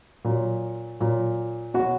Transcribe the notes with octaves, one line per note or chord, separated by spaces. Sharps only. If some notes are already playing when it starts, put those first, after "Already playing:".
A#2 F#3
A#2 F#3
B2 F#3 F#4